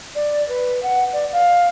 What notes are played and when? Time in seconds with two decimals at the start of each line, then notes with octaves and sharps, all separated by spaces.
0.15 D5
0.49 B4
0.83 F#5
1.13 D5
1.32 F5